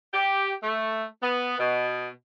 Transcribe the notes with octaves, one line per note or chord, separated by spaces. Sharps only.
G4
A3
B3
B2